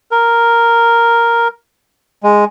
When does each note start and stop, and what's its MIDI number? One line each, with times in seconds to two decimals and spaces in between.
0.11 1.48 70
2.23 2.45 56